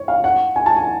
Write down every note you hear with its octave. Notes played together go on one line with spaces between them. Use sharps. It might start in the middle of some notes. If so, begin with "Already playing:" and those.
Already playing: C#5
F5
F#5
G#5
A5
G#5